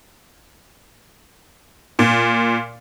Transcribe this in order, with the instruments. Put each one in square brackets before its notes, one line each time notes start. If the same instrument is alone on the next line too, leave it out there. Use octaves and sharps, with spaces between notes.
[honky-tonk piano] A#2